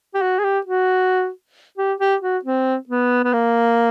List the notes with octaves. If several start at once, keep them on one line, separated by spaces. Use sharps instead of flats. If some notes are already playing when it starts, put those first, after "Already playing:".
G4
F#4
G#4
G4
F#4
G4
G4
F#4
C4
B3
B3
A#3